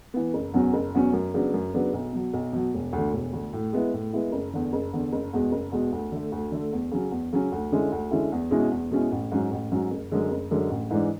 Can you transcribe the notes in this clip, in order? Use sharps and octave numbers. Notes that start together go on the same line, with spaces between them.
E3 B3
F#1
E2 B2 F#3 C#4
F#1
E2 B2 F#3 C#4
F#2
C#3 F#3 B3 D4
F#2
C#3 F#3 B3 D4
B1
B2 F#3
B1
B2 F#3
E1
D2
D3
E1
D2 D3
A2
G#3 B3 E4
A2
G#3 B3 E4
F#1
E2 D3
F#1
E2 D3
F#1
E2 B2 G#3
F#1
E2 B2 G#3
D2
D3 A3
D2
D3 A3
E2
C#3 F#3 C#4
E2
C#3 F#3 C#4
D2
D3 G#3 C#4 E4
D2
D3 G#3 C#4 E4
E2
B2 G#3 C#4 E4
E2
B2 G#3 C#4 E4
A1
G#2 F#3 C#4
A1
G#2 F#3 C#4
F#1
F#2 D3 G#3
F#1
F#2 D3 G#3
A1
G#2 E3 G#3 D4